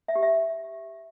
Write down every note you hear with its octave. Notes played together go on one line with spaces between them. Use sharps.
E5
G4
E5